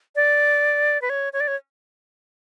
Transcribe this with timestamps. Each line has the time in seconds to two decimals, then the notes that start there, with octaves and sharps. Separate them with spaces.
0.16 D5
1.02 B4
1.10 C#5
1.33 C#5
1.40 D5
1.48 C#5